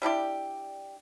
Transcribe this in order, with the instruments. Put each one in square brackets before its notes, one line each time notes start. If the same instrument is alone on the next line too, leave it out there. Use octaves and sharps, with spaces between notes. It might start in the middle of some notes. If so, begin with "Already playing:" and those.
[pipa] G3 D4 E4 G4